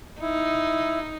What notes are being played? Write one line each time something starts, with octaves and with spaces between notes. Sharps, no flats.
D#4 E4